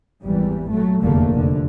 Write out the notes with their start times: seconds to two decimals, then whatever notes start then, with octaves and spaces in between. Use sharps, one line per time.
0.22 G#1 E2 E3 G3
0.69 A#2 F#3 A3
1.02 F1 E2 A#2 D3 A3 A#3
1.31 F1 D3